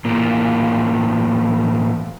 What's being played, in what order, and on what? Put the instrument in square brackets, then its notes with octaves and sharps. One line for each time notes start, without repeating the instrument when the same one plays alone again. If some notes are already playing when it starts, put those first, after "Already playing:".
[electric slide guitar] A2 E3 A#3 F4